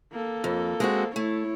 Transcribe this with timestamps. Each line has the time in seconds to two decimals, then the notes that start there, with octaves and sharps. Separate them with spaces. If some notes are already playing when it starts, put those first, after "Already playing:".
0.13 A#3 A4
0.44 F2
0.80 G#3 C4 F#4
1.16 A3 E4 C#5